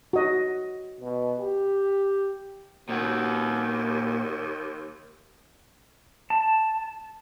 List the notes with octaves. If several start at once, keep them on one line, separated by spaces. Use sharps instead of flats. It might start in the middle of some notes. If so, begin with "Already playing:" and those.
F#4 D#5
B2
G4
D#2 A#2 F#4
A5